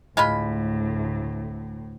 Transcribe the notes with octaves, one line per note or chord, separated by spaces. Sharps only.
D2 A2 G#3 F4 B5